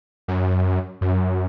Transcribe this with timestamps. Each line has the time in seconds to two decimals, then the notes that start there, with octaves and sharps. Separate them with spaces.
0.28 F#2
1.01 F#2